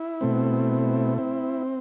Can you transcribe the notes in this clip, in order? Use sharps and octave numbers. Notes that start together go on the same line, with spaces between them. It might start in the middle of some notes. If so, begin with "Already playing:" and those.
Already playing: E4
B2 A3 C4
C4